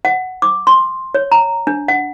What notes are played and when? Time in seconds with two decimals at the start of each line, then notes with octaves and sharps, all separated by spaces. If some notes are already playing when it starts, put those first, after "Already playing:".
0.05 F#5
0.42 D6
0.67 C6
1.14 C#5
1.32 A#5
1.67 D4
1.88 F#5